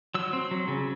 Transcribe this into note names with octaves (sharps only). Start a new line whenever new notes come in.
F#3 E6
C4
F#3
C#3